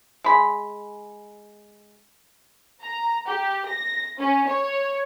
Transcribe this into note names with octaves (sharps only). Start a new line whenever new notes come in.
G#3 B5
A#5
G4
A#6
C#4
C#5